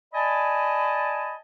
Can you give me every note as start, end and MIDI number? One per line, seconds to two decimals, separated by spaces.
0.14 1.36 74
0.14 1.36 75
0.14 1.36 80
0.14 1.36 81
0.14 1.36 83